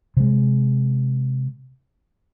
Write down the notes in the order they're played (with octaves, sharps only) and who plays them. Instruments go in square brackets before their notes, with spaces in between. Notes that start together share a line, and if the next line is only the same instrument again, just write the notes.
[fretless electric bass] C3 G#3